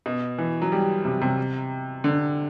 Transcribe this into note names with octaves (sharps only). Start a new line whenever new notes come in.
B2
E3
F#3
G3
C3
C3
D3